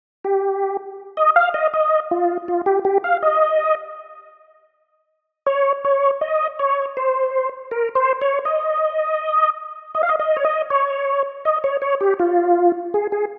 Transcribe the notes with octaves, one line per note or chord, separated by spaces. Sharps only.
G4
D#5
F5
D#5
D#5
F4
F4
G4
G4
F5
D#5
C#5
C#5
D#5
C#5
C5
A#4
C5
C#5
D#5
D#5
F5
D#5
D#5
C#5
D#5
C#5
D#5
C#5
C#5
G4
F4
G#4
G#4